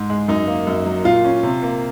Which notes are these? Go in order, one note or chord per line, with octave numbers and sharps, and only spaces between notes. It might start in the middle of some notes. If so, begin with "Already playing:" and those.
Already playing: G#2
G#3
F#2 D#4
A#3
F#2
F#3
A#2 F4
C#4
C3
A#3